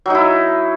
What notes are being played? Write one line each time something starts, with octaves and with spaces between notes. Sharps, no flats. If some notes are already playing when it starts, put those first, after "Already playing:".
F#3 D#4 E4